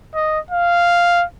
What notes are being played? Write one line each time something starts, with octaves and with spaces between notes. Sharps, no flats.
D#5
F5